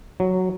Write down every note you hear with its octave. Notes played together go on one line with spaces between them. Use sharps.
F#3